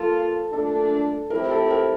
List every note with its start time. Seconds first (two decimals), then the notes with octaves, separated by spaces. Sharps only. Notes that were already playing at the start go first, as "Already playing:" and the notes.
Already playing: F3 A#3 F4 A4
0.52 A#2 A3 D4 A4
1.30 A2 F3 C4 E4 G4 A#4
1.51 A4
1.70 A#4